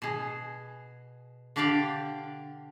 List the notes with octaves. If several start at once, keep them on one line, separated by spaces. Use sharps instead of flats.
B2 G#4
D3 D4 G4 D5 F5 G5